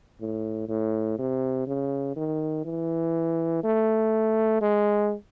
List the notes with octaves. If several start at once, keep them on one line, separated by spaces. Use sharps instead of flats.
A2
A2
C3
C#3
D#3
E3
A3
G#3